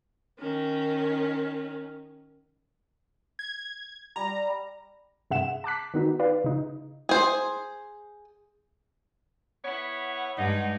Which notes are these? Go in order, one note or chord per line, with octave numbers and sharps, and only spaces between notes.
D#3 C#4
G#6
G3 A#5
G2 C3 G#4 E5 F#5 E7
A5 D6 F#6 B6
D#3 B3 D#4 F#4
D#4 B4 D5 F5
C#3 D#4
G#4 C5
B3 E4 C#5 F#5
G2 G#3 D#4